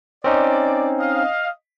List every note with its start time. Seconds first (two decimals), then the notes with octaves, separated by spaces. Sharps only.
0.24 C4 C#4 D#4 D5
1.00 D#5 F5